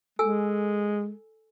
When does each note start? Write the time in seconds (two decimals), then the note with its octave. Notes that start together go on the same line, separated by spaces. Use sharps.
0.19 G#3 A4 G#5 E6